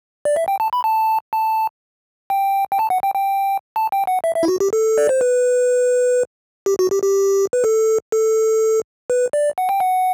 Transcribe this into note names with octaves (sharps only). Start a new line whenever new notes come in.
D5
E5
G5
A5
B5
A5
A5
G5
G5
A5
F#5
G5
G5
A5
G5
F#5
E5
E5
E4
F#4
G4
A4
D5
C5
B4
G4
F#4
G4
G4
B4
A4
A4
B4
D5
F#5
G5
F#5